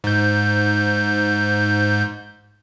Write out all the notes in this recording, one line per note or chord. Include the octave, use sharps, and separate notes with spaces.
G#2 G6